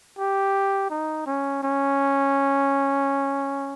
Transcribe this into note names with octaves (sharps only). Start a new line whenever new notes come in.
G4
D#4
C#4
C#4